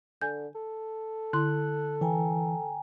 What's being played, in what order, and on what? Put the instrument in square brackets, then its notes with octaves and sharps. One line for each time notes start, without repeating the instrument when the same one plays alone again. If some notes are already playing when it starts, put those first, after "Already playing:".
[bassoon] D3 [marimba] G#5 G6
[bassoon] A4
[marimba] D3 E4 C6 [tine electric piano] F#6
[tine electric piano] E3 [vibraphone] G5 G#5 A#5